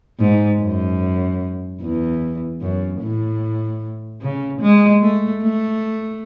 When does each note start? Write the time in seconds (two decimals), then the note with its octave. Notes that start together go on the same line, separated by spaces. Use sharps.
0.20 G#2
0.61 F#2
1.81 E2
2.62 F#2
3.01 A2
4.22 C#3
4.61 G#3
5.02 A3
5.42 A3